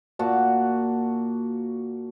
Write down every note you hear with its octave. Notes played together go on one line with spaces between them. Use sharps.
A#2 F#4 A5